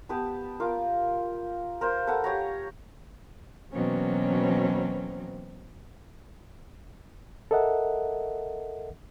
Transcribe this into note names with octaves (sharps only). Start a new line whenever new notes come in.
B3 G4 B4 A5
F4 A#4 D6
A#4 C5 F5
A4 B4 F5 F#5
G4 C#5 A#5
B2 E3 F#3 A#3 C4 C#4
A4 A#4 D#5 E5 F#5